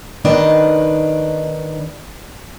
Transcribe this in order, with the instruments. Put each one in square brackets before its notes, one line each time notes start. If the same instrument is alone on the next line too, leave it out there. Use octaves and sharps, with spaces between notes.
[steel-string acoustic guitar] D#3 D4 B4 D#5